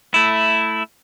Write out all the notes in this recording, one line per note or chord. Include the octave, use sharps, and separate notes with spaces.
A3 E4